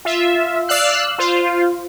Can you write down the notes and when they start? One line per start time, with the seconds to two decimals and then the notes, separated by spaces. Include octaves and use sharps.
0.05 F4 E5
0.68 D5 F5 E6 F#6 C7
1.18 F4 C5 F5